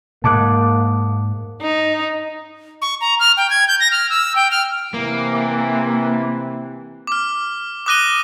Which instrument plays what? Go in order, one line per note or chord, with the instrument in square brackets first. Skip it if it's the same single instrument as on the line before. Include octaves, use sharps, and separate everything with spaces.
[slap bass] G#2 [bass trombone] A#3 [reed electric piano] A5 D6 F#6
[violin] D#4
[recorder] C#6
A#5
F6
G5
G#6
G6
A#6
F6
E6
G5
F6
[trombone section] C3 E3 [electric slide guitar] A#3
[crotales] D6 F6
D6 D#6 F#6 A#6 D#7 G7